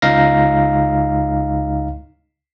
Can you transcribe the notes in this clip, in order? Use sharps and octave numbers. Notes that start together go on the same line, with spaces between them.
C#2 D#4 F5 A#6